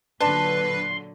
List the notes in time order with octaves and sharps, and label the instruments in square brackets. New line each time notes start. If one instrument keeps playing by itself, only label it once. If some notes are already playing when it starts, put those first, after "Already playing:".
[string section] A#2 D3 F#3 [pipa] D4 A5 [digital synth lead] B4 [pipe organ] C6